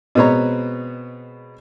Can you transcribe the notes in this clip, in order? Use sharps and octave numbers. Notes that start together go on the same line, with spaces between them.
B2 G#3 B3 C4 C#5 A#5